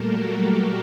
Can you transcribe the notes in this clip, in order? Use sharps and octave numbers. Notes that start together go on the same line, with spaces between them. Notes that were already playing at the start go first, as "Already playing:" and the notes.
Already playing: A#2 G3 A3 A#3 A4 A#4
F#3 F#4
G3 G4